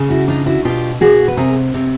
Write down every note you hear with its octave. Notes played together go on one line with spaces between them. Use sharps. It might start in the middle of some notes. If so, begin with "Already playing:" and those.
Already playing: C#3
E4 F#4
D4 D#4 F4
E4 F#4
B2 F4 G4
B2 F#4 G#4
B4
C3 G#4 A#4
C3